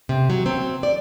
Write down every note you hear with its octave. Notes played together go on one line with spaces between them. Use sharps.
C3
F#3
C4
D5